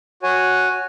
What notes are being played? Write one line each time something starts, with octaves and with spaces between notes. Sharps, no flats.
F#4 C#5 G#5